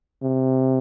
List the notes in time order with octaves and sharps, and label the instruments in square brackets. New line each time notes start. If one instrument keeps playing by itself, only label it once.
[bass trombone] C3